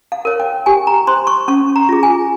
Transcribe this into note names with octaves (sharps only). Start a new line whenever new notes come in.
F5
A#4 C#5
G5
G4 G#5
A#5
C5 C6
C#6
C#4 C#6
A#5
F4 G#4
G#5